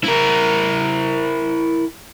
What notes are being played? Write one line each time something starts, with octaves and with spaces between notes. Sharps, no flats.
E4 A#4